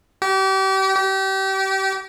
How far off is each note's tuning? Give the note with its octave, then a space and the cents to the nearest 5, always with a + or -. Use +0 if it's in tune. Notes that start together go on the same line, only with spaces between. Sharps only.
G4 -35
G4 -30